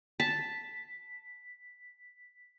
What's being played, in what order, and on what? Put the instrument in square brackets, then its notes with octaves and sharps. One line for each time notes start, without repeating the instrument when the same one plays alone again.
[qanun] A5 [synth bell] B6